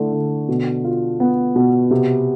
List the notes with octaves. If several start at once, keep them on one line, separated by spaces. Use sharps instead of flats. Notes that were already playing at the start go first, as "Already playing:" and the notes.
Already playing: D3 A3 E4
D3
B2
F4
B3
B2
C3